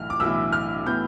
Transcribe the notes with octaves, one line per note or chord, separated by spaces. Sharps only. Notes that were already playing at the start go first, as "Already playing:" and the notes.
Already playing: B1 A2 E3 F6
D6
B1 A2 E3 E6
F6
A2 E3 B3 G6